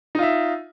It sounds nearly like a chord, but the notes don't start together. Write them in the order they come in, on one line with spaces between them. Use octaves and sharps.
D#4 F4 E5